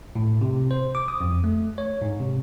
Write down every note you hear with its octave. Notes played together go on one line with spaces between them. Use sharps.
A2
C3
C5
D6
D#6
F2
A3
C#5
G#2
C3